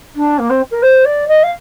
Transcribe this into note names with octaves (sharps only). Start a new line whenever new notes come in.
D4
A#3
C4
A#4
C5
D5
D#5
F5